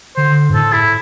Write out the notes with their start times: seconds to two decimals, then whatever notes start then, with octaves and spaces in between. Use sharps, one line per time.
0.16 D3 C5
0.49 G2
0.54 A2 A4
0.73 E4